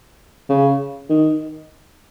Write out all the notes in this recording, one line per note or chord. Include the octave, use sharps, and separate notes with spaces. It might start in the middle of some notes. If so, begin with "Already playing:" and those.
C#3
D#3